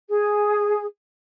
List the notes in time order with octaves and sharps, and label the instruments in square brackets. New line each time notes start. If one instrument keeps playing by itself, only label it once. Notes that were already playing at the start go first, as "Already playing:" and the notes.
[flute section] G#4